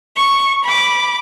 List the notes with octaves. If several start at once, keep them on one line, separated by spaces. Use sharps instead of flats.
C#6
B5 D6